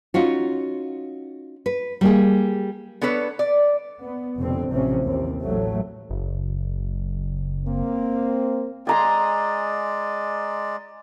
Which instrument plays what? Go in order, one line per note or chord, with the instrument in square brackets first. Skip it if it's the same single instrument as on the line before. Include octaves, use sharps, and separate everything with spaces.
[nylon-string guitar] C#4 D#4 F4 F#4
B4
G3 A#3 G#4
[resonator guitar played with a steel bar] B3 D4 A4 B4 C#5
D5
[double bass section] B3
F1 F2 B2 D3 C4
A1 C3 F3 C4 C#4
D#2 A2 C3 C4
A1 A2 F#3 A3
[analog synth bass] F#1
[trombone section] A#3 C4
[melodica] G#3 D5 [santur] G#5 A#5 C6